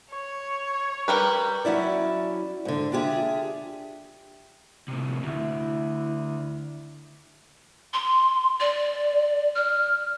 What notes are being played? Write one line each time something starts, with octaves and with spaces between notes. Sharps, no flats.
C#5
G3 A#4 B4
F#3 C#4 E4 D5
G#2 D3
D4 F4 G4 G#4 E5
A2 C3
D2 E4
C6
D5
F6